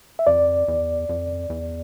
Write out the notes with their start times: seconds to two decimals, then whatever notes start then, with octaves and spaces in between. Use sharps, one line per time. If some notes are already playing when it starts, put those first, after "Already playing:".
0.19 E5
0.27 F2 D5
0.68 E2
1.09 F2
1.50 E2